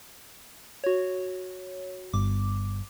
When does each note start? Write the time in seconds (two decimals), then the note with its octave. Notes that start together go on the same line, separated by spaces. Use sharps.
0.84 F#4 C#5
2.14 G1 D6